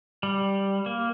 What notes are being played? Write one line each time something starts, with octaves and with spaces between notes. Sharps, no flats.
G3
A#3